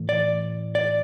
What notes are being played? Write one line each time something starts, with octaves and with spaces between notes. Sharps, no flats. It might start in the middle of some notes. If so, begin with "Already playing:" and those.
Already playing: A2 E3
D5
D5